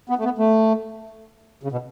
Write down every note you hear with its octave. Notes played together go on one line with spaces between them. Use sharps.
B3
A3
B3
A3
C#3
B2